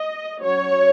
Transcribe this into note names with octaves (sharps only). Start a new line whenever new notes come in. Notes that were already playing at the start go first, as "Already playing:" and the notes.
Already playing: D#5
F#3 C#4 C#5